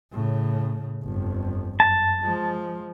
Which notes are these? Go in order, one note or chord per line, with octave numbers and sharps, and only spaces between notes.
A2 C#3
G1 F2
F#2 A5
F3 G#3